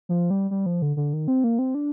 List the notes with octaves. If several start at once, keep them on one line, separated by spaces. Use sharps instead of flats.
F3
G3
G3
F3
D3
D3
D#3
C4
A#3
C4
D4